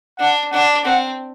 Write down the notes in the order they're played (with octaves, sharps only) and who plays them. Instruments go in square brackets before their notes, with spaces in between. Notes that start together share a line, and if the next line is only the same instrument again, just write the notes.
[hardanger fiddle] D4 [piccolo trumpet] F#5
[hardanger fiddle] D4 [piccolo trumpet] F#5
[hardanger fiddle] C4 [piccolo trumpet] F#5